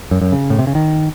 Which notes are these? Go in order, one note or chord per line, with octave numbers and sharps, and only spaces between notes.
F#2
F#2
C#3
A2
C3
C#3
D#3